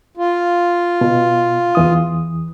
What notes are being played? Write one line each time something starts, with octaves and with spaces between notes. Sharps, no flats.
F4
B2
E2 E3 D#6